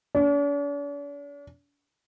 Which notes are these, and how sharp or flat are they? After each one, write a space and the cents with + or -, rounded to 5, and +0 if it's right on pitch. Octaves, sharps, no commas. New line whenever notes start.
D4 -45